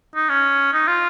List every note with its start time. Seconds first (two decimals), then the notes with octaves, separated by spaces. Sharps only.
0.15 D#4
0.29 C#4
0.73 D#4
0.87 F4